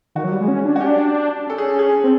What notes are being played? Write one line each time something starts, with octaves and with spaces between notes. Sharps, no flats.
D#3 F#4
F#3
G3
G#3
C#4
D4
C#4 F#4
G4
D4
C#4 A4
G#4
G#4
C4